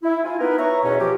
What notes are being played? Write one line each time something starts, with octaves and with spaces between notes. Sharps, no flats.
E4
F4 G#5
B3 D#4 A#4 B4
C#5 E5 A#5 C#6
E2 B2 C#4 C#5
F3 G4